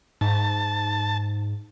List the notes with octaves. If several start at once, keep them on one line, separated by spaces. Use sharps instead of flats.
G#2 A5